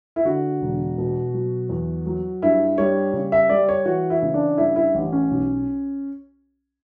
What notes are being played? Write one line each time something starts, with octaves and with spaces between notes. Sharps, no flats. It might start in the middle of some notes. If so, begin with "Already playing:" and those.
E4
D3 F#4
E1
B2
F#3
E2
F#3
G2 E4
G3 C#5
C#3
E5
G3 D5
C#5
E3 F#4
E4
C#3
D4
G2 E4
E4
A1
C#4
B1